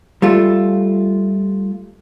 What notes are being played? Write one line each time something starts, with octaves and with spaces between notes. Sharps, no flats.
G3 A3 F4